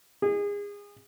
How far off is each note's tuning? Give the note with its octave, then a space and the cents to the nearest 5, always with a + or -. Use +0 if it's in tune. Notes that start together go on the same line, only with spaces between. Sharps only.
G#4 -30